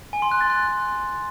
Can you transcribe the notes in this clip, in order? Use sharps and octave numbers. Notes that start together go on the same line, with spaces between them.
G#5
C6
F#6
A6
F#6